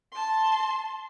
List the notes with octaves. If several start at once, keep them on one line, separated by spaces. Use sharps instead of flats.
A5 C6